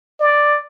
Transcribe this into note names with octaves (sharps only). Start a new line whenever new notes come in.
D5